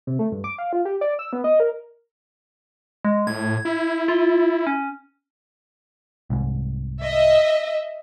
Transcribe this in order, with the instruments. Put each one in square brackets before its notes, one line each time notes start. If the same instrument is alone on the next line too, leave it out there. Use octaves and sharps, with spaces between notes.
[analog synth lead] C3
A3
G2
D6
F5
F4
G4
D5
E6
B3
D#5
A#4
[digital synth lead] G#3
[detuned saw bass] A2 [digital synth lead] G#6
[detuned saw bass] E4
[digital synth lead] F4
C#4
[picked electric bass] C2 G#2
[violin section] D#5 E5